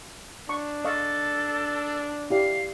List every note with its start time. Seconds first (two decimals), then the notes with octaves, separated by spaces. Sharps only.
0.49 D4 C#6
0.85 A4 D#5 F5 C#6
2.30 E4 G4 D5 F5